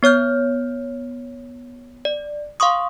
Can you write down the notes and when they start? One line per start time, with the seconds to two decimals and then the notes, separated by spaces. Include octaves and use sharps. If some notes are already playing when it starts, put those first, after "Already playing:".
0.03 B3 C#5 F6 G6
2.05 D5
2.60 F5 C6 C#6 D#6